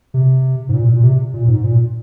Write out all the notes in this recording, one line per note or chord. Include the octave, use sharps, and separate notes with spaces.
C3
G#2
A#2
A#2
C3
A#2
G#2
A#2